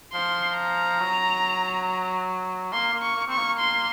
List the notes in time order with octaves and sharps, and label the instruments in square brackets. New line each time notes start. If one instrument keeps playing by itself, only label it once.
[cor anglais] F3 [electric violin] C6
[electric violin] A#5
[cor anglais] F#3
[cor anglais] A#3 [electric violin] C6
[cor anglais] A#3
[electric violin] C#6
[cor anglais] A#3
[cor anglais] C4 [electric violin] C#6
[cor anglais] A#3
[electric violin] C6